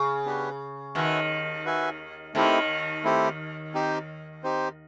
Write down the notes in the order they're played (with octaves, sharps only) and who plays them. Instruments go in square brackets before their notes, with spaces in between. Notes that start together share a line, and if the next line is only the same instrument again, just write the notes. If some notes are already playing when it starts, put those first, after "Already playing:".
Already playing: [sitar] C#3
[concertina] B3 D4 G4 B4
[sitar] D#2 D#3 [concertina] F#4 B4 E5 G#5
[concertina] F#4 B4 E5 G#5
[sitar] D#2 D#3 [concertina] A3 C4 E4 G4
[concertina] A3 C4 E4 G4
C4 D#4 G4 C5
C4 D#4 G4 C5